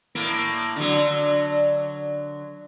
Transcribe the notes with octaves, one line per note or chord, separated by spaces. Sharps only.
A2 A#3
D3 F#3